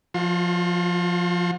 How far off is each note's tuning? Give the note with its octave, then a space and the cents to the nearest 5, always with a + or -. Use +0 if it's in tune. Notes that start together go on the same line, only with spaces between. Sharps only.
F3 +5 F#4 -40 C6 +35